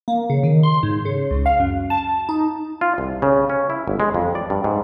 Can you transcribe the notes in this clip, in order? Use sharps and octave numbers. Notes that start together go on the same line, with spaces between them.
A#3
C#3
D#3
C6
G#2
C#3
C#2
F5
F#2
A5
D#4
F4
C2
C#3
C#4
E4
G1
G#3
F2
D5
G2
G#2